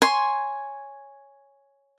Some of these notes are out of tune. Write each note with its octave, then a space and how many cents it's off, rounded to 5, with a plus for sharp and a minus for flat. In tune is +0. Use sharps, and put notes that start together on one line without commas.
C#5 +0 G#5 +0 C6 +0